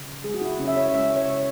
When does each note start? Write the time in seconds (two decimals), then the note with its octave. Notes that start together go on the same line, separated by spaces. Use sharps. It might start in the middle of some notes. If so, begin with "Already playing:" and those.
Already playing: C#3
0.24 G#3 G#4
0.34 F#4
0.42 E4
0.59 C#3 C#4
0.67 E5
0.77 C#5
0.94 G#3 E5
1.16 C#5
1.27 C#3